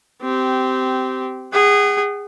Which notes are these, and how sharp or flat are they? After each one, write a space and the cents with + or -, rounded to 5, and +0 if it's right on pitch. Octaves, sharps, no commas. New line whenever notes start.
C4 -15 G4 -20
G#4 -20 F#5 +35